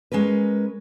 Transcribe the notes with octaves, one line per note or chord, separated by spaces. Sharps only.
G#3 C#4 A#4 B4